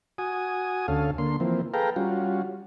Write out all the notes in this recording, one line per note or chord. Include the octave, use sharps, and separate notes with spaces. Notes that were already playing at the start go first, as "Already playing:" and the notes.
F#4 G#5 D#6
D2 C#4 A4 F5
D3 A#3 C6
E3 F3 A#3 C4
G#4 A4 B4 F5 G5 A#5
G3 C#4 F4 F#4